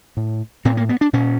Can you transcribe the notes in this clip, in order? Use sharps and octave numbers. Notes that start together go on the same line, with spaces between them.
A2
A2 C4
A#3
B3
D4
A#2 C#4